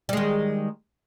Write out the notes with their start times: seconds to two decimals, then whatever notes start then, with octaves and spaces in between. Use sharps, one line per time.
0.09 G3
0.13 G#3
0.17 D#3